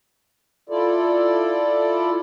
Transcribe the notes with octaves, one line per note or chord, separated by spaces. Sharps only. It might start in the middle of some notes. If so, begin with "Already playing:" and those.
E4 F4 A4 D5